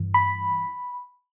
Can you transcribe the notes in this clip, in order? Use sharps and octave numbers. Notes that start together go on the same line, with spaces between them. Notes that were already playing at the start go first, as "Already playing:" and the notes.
Already playing: G2 E3
B5